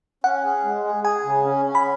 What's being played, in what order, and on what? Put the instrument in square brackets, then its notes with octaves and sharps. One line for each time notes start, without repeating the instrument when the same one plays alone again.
[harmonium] C#4 [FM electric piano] F#5
[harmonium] G#4
G#3
G#4
[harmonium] G#4 [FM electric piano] G#5
[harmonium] C#3
C#4
C#4
[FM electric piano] B5